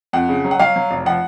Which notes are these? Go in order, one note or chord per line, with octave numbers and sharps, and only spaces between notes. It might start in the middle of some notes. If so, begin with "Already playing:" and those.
F2 F#5
C#3
F#3
F#5
F#3 F5
F#3
F1
F3 F#5